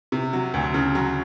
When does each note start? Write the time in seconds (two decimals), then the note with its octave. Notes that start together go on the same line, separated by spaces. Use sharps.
0.12 C3
0.33 F#3
0.54 D2
0.74 C#3
0.95 F#3